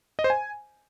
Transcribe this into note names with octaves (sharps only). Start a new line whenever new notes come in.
D#5
C5
G#5